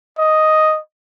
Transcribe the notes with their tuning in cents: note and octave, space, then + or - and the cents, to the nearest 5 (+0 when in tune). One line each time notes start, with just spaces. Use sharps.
D#5 +0